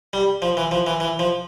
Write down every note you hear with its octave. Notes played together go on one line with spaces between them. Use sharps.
G3
F3
E3
F3
E3
E3
F3